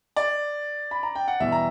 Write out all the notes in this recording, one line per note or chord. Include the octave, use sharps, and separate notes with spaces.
D5
B5
A#5
G5
F#5
E2 B2 G3 E5
A#5